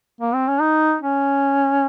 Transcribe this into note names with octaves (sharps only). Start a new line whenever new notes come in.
A#3
C4
C#4
D#4
C#4